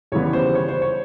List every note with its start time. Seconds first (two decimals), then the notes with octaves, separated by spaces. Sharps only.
0.12 D#2 C#3 E3 G3 B3 C#5
0.33 C5
0.55 C#5
0.69 C5
0.82 C#5